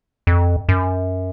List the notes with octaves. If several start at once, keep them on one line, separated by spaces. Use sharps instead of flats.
F2
F#2